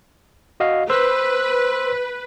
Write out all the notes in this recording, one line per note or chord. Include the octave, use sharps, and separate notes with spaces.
F#4 D#5 F5
B4 C5 C6 E6